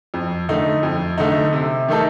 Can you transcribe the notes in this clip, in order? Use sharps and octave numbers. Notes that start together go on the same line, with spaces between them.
F2
D3 A3 D#4
F2
D3 A3 D#4
C3
D#3 A3 D#4 A4